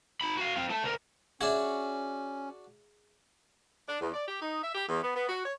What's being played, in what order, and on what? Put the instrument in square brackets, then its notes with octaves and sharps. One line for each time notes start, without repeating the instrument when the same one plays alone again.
[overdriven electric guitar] D#4 B5
F#4 F5
C4 F4
A3 A5
D2 A#4
[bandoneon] C#4 [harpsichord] D4 F#4 [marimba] G#4 E5
[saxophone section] D4
E2
D5
G4
D#4
E5
G4
E2
B3
B3
F#4
C#5